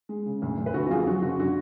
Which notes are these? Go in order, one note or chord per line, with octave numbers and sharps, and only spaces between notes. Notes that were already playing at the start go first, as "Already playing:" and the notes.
G#3
C#3
D2
D2
B4
D3 F#4 A4
F#4
F2 F4 G#4
F#3 F#4
F#1 F#4
D3 F#4